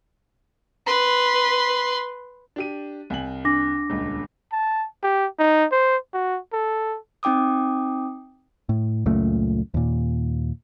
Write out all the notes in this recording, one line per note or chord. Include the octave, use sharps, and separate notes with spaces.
B4 C6
D4 G4 D#7
C2 G#5 F#7
D4 D6 A#6
D#1 C#2
A5
G4
D#4
C5
F#4
A4
C4 D#4 G5 D6 D#6
A2
C#2 F#2 A#2 A3
D#2 A#2